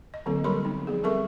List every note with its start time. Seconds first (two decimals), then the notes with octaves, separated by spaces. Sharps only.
0.14 D#5
0.26 D3 F#3 A#3 C4 A4
0.44 F#3 G3 G4 A#4 B5 C6
0.65 B3 D#4
0.87 F3 B3 G#4
1.03 G3 C4 A4 A#4 E5 C#6